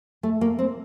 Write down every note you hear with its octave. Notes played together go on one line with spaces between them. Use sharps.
A3
A#3
C4